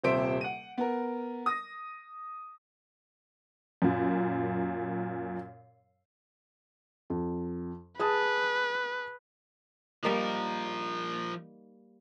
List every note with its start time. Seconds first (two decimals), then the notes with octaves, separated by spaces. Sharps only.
0.04 D#1 C3 C5 E5 D7
0.41 F#5 D#7
0.78 B3 A#4
1.46 D#6 A#6
3.82 F#2 A#2
7.10 F2
7.99 G#4 B4 A5 D#6
10.03 F3 G3 A#3 D#4 A#4